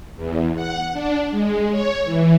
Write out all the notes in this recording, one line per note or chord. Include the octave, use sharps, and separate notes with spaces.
E2
F#5
D4
G#3
C#5
E3